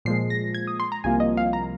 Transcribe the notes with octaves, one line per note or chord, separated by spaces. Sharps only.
A#2 F3 G#3 C7
A#6
G#6
D#6
C6
A#5
C2 C3 F3 A#3 F4 G#5
D#5
F5
A#5